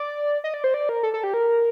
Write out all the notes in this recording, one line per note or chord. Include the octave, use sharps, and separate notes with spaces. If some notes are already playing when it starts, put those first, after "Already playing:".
Already playing: D5
D#5
D5
C5
D5
A#4
A4
A4
G4
A#4